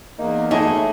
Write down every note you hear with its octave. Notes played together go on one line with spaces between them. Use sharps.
E2 A#3 D#4
F#3 A3 D#4 E4 G#4 D#5